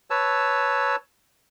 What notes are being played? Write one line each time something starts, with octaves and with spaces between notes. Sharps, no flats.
B4 C#5 A5 E6